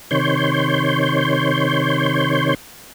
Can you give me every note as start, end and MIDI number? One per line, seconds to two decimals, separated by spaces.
0.11 2.54 48
0.11 2.54 51
0.11 2.54 73
0.11 2.54 84
0.11 2.54 91